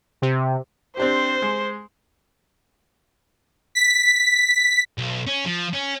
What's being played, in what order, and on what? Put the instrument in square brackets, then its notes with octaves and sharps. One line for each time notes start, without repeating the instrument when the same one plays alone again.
[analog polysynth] C3
[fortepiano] C4 D4 G4 [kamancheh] C5
[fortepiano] G#3
[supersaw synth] B6
[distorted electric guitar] B1
C#4
F3
C#4